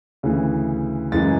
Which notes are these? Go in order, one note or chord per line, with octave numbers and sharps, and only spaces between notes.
D2 C#3 E3
F#2 C#3 E3 G#3 A6